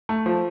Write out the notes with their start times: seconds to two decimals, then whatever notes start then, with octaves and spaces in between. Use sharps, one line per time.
0.09 A3
0.26 F3